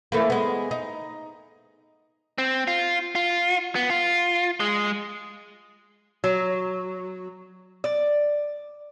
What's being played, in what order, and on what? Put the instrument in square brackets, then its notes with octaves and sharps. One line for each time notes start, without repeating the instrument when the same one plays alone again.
[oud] E3 A3 A#3
G#3 B3
D#4
[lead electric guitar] C4
F4
F4
B3
F4
G#3
[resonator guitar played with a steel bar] F#3
D5